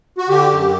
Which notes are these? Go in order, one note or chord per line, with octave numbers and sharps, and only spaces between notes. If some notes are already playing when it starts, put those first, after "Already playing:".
F#4
D3 G4
F#2